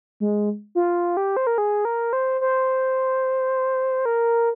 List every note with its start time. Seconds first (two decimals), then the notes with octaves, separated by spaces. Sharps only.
0.20 G#3
0.75 F4
1.17 G4
1.37 C5
1.47 A#4
1.58 G#4
1.85 A#4
2.13 C5
2.41 C5
4.05 A#4